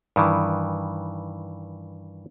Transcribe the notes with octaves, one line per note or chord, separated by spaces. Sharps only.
G2 D#3 E3